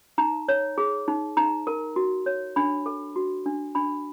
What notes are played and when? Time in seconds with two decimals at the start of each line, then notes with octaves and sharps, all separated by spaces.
0.18 D#4 A#5
0.48 C#5
0.78 G#4
1.08 D#4
1.37 D#4 A#5
1.67 A#4
1.96 F#4
2.26 C#5
2.56 D4 B5
2.86 A4
3.16 F#4
3.46 D4
3.75 D4 B5